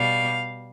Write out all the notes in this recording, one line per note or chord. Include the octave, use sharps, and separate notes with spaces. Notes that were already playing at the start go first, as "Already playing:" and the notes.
Already playing: B2 G3 F5